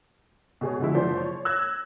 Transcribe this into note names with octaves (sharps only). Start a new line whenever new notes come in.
B2 G#4 C#5
B2 D3 F3 G#3 E4
F#1 F3 C5 D5
C#5
E6 F#6 G#6 A#6